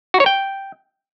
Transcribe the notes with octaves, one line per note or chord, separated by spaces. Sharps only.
F#4
C#5
G5